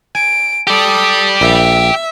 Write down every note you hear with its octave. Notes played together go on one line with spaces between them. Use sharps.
G#5 D7
G4 A4 D5 D#6
A#1 E5